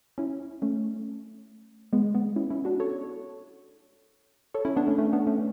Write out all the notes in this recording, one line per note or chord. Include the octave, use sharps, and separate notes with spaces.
C#4 E4
A3 C#4
G#3 B3
G#3 B3
C#4 E4
C#4 E4
D4 F#4
A4 C#5
A4 C#5
C#4 E4
B3 D4
A3 C#4
A3 C#4
B3 D4
A3 C#4